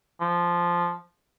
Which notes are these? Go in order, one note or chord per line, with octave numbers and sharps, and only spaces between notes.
F3